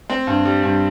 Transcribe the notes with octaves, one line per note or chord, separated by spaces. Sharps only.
C4
G2
G3
G2